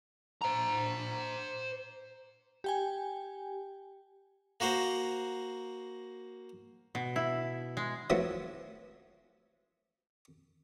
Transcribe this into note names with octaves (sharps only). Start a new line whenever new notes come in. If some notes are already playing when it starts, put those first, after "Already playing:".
C5 A#5
G4 G5 G#5
A#3 F#4 A#4 C5
B2
E4
G#3
F3 F#3 A3 B3 E4